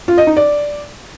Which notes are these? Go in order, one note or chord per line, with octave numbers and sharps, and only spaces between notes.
F4
D#5
D#4
D5